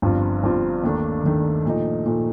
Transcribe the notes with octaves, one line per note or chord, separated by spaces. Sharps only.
G1 G2 F3 C4 F4
G1 G2 F3 C4 F4
D#2 D#3 A3 D4
D#2 D#3 A3 D4
A#2 F3 A3 D#4
A#2 F3 A3 D#4